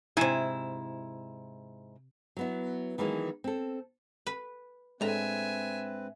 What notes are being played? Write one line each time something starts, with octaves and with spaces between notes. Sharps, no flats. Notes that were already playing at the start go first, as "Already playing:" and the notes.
G#2 C3 E4 G#5
F#3 B3 E4
D#3 E3 F#3 G#3 A#3 G#4
C4 A4
B4
A2 G#3 C4 D4 B4 E5 G#5 A#5